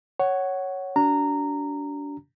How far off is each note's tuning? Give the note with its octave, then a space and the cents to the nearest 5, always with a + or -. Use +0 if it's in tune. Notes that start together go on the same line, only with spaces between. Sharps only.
C#5 +0 F#5 +15
D4 -35 F#4 +35 A#5 -15